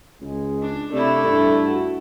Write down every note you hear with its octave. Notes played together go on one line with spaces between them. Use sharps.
C#2 G#3
D4
C3 A3 D4 E4
G2 A4
F#4